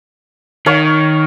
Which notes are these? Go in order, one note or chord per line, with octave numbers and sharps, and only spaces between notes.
D#3 C#5 F5 C#6